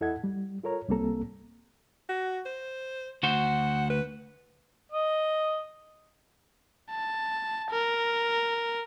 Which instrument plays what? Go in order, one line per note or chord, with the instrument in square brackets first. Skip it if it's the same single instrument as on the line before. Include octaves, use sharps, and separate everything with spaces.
[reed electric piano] E2 E4 A4 D#5 F#5 G#6
G3
F4 A4 A#4 C#5 A#5
C2 G3 A#3 C4 A4 A#5
[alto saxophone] F#4
C5
[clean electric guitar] D2 F#4 C5 [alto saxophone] F#5
[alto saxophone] B4
[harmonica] D#5
[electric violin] A5
A#4